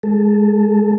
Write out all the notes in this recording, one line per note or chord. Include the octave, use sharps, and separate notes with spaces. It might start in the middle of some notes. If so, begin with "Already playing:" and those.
G#3 A4